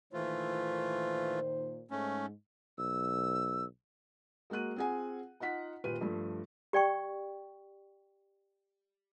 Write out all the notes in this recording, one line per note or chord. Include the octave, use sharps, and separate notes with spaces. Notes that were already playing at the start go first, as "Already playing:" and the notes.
A#2 D#3 E3 A3 F4 C5
G#2 A3 C#4
B1 E6
G#3 A#3 F#4 F#6 D#7
C4 F4 G#4 F#5 G#5
D#4 F4 F#5 B6
D#1 F4 G4 B4 D#7
G2 F3 A3
G4 D5 G5 C#6